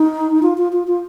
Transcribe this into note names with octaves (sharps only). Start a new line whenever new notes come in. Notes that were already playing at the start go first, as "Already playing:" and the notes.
Already playing: D#4
F4
F4
F4
F4